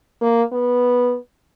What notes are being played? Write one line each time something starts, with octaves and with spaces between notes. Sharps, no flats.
A#3
B3